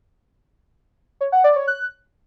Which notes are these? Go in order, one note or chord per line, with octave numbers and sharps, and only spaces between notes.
C#5
F#5
D5
C#5
F#6